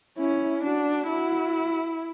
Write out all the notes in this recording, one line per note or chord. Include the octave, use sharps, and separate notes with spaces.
C#4 E4
D4 F#4
E4 F#4